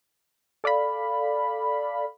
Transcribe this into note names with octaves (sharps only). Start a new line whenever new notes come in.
A4 D5 F5 B5